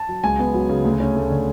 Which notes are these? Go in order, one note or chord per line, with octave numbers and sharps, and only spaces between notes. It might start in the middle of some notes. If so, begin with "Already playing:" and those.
Already playing: A5
F#3
C#2 G#5
B3
F#3
C#3
D2
C#4
A3
D3